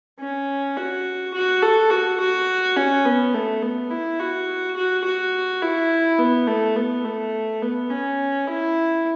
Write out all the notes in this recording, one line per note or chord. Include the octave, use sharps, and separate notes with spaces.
C#4
F#4
F#4
A4
F#4
F#4
C#4
B3
A3
B3
E4
F#4
F#4
F#4
E4
B3
A3
B3
A3
B3
C#4
E4